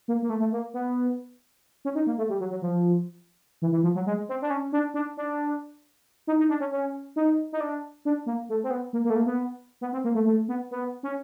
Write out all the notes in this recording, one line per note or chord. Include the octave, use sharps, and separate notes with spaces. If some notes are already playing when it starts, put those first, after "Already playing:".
A#3
A#3
A3
A3
A#3
B3
C#4
D#4
A#3
A3
G3
F#3
F#3
F3
E3
E3
F3
F#3
G#3
C4
D4
C#4
D4
D4
D4
D#4
D#4
D4
C#4
C#4
D#4
D#4
D4
D4
A#3
A3
C4
B3
A#3
A#3
A3
A#3
B3
B3
C4
A#3
A3
A3
B3
B3
C#4